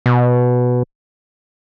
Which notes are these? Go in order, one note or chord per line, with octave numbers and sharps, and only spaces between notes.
B2